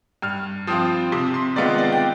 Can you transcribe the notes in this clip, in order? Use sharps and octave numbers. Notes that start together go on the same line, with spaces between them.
G2 F6
F3 C4 F4 D#6
C3 D#6
C6
D#3 G#3 B3 F4 D5
D5
G5